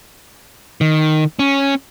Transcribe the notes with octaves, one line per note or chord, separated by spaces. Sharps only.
D#3
C#4